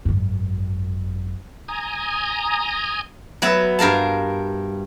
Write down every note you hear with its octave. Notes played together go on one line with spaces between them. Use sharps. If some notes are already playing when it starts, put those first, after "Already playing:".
G#1 F#2
G#5 A#5 D#6
F#3 B3 E5
G2 A#4 F5 A5